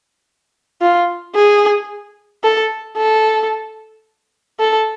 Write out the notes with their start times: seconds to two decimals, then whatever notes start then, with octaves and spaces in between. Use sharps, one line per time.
0.82 F4
1.35 G#4
2.44 A4
2.97 A4
4.60 A4